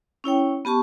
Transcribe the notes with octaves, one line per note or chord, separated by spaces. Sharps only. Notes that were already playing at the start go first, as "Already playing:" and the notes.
C#4 E4 C#5 G5
B3 G4 A5 C#6